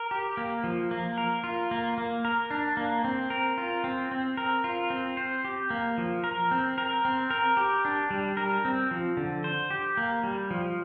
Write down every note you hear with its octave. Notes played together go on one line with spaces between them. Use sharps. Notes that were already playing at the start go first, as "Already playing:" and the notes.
Already playing: A#4
G4
A#3
F3
A#3
A#4
F4
A#3
A#3
A#4
D4
A#3
C4
A#4
F4
C4
C4
A#4
F4
C4
C5
G4
A#3
F3
A#4
C4
A#4
C4
A#4
G4
D4
G3
A#4
C4
F3
D3
C5
G4
A#3
G3
F3